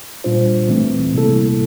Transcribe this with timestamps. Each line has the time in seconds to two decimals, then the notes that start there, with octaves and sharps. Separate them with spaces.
0.24 A#2 G3 D4 F4 C5
0.69 E3 A3 C4
1.13 C3 G3 A#3 E4 A4